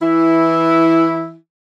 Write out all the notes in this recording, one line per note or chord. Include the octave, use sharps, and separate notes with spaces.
E3 E4